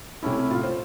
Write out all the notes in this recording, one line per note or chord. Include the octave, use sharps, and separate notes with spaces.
C3 A3 C#4 E4
A2 F4
C5